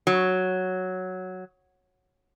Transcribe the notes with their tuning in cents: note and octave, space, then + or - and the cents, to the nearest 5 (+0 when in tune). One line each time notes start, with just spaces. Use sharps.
F#3 +0